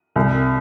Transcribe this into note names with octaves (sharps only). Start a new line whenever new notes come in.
C2